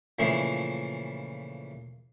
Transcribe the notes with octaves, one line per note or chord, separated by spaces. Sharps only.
A#2 C#3 E3 F3 A3 E4